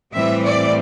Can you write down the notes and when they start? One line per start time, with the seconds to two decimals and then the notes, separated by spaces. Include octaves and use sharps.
0.13 A2 E3 G3 C4 E5
0.43 D5